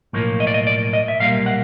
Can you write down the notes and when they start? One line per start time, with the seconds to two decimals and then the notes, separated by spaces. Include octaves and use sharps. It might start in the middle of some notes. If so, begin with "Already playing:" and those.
0.13 B1 A2 F3 A#3
0.40 D#5
0.47 D5
0.54 D#5
0.67 D5
0.93 D#5
1.08 E5
1.20 B1 A#2 G3 A#3 F5
1.46 F#5